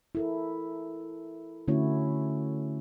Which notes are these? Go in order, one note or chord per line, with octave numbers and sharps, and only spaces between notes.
E4 A4 A#4
D3 A3 C#4 E4 F#4 C#5